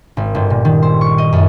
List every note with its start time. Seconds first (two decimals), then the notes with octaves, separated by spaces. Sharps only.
0.17 G#1
0.35 G1
0.50 A#2
0.65 D#3
0.82 C5
1.01 C#6
1.18 D#5
1.33 F#2